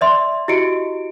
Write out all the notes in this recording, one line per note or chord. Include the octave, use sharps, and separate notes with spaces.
D5 E5 C6
E4 F#4 G4 D#5 C#7 D7